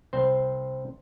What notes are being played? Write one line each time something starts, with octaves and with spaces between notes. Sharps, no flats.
C2 C4 C5